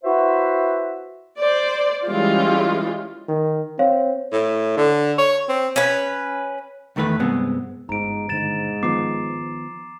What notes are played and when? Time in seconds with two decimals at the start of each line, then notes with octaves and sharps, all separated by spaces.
0.04 E4 F#4 B4 C5 E5
1.39 C5 D5
2.06 E3 G3 G#3 C#4 F4
3.28 D#3
3.79 C4 C#5 F5
4.32 A2
4.77 D3
5.18 C#5
5.49 C4
5.76 C#4 B4
6.96 E2 D#3 A3 A#4 B4
7.19 C2 G2 G#3 B3 C4
7.89 G1 G#2 F4 A#5 D7
8.29 D#1 G#2 D3 A6 E7
8.83 D#3 F3 B3 D6 C7